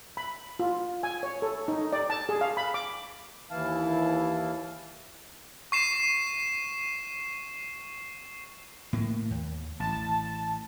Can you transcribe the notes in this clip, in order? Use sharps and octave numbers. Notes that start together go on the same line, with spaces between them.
B5
F4
G#5
C#5
A4
D#4
D5
A5
G#4
F5
B5
D6
D#2 E3 E4 F5 A5
C#6 C7 E7
A2 A#3
D#2
A1 A5